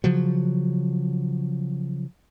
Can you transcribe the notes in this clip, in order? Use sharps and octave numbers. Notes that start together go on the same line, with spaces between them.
C#3 F3 F#3